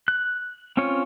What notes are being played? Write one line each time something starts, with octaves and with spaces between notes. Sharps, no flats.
F#6
C4 C#4 F4 C#5